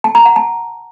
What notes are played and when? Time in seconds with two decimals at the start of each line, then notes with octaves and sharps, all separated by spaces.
0.04 A5
0.15 A#5
0.25 F#5
0.36 A5